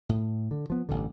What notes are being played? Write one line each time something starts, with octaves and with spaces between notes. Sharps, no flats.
A2
D3
F3 B3
A1 G2 D3